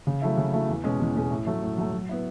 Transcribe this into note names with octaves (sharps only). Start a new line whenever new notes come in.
C#3
F#3 A3 E4
C#3
F#3 A3 E4
E2
B2 G#3 C#4 G#4
E2
B2 G#3 C#4 G#4
A2
F#3 A3
A2
F#3 A3
F#3
B3 E4